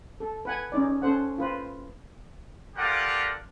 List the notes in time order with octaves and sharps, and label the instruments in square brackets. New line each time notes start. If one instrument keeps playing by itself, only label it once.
[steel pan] A4
B4 F#5 G#5
C#4 D#4 D5
C#4 A4 C5 F#5
F4 B4 C5
[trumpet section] F4 G4 A4 A#4 D5 F#5